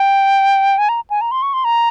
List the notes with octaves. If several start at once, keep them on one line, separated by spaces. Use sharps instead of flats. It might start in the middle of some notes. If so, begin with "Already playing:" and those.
Already playing: G5
G#5
A#5
G#5
A#5
C6
C#6
C6
A#5